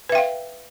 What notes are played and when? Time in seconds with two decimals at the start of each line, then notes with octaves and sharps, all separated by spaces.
0.09 B4
0.12 E5
0.15 G5
0.18 F5